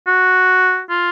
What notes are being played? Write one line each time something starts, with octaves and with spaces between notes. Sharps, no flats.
F#4
F4